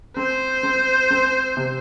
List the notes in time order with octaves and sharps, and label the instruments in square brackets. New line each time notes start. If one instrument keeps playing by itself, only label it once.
[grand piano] C4 [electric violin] C5
[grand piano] C4
C4
C3